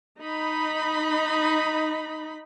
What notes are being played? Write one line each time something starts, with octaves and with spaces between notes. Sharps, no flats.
D#4 B5